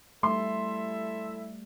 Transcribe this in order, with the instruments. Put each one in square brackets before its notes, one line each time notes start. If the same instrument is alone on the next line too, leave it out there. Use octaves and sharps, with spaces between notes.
[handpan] G3 A3 [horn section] E4 A4 E5 [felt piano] C6